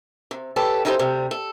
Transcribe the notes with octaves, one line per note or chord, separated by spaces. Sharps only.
C3
G2 G4 A4 B4 C#5 A5
C#4 D#4 E4 G4 G#4 C5
D2 C3 G3
A4